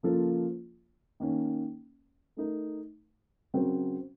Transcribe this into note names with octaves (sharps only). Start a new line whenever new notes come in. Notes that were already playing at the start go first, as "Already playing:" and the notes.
C#3 F3 A#3 F4 A4
D#3 A#3 C#4
A3 D#4 A#4
C#3 F#3 C4 F#4 A#4